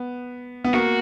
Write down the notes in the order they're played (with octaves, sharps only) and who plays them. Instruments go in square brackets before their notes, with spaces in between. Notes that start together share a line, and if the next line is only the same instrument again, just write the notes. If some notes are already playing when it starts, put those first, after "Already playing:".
Already playing: [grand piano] B3
B3
[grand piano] A#3 [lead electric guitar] F#4